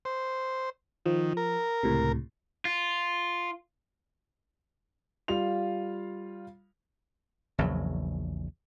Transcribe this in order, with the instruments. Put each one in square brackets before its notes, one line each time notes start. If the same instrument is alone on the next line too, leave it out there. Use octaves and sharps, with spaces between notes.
[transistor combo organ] C5
[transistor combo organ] D#3 [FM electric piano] F3
[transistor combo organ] A#4
[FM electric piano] C#2 A2 C3
[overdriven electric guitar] F4
[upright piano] G3 F4 F5 F7
[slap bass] A#1 E2 C#3 F#3